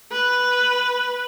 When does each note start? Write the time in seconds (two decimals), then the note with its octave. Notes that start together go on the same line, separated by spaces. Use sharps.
0.11 B4